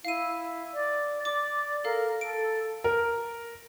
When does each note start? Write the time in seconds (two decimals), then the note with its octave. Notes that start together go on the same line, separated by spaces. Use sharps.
0.05 E4 F5 D#7
0.74 D5
1.25 D5 D6
1.84 A4 A#4 F5
2.21 A4 D7
2.84 A#4